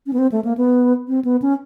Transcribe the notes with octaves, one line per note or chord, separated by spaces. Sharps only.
C#4
B3
C4
A3
A#3
B3
C4
B3
C#4